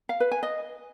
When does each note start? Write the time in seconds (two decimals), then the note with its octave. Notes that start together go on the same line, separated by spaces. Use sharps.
0.09 F5
0.20 B4
0.32 G#5
0.43 D#5